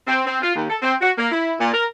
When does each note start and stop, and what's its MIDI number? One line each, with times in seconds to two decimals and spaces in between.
0.07 0.22 60
0.26 0.41 60
0.42 0.53 65
0.55 0.68 39
0.70 0.77 69
0.82 0.94 60
1.01 1.11 66
1.18 1.27 58
1.32 1.53 64
1.60 1.73 46
1.74 1.86 70